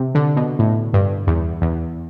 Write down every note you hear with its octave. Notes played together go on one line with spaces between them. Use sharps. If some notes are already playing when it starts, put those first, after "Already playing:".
Already playing: C3
D3
B2
A2
G2
E2
E2